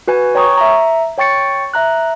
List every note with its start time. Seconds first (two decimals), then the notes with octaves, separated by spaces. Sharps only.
0.08 F#4 B4 G#5
0.35 C#5 G5 A#5 C#6 D#6
0.57 E5 A#5
1.18 C#5 G5 C#6 A6 C#7
1.74 E5 A#5 F#6